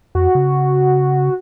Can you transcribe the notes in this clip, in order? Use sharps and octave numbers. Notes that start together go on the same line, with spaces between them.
F2 F#4
C#3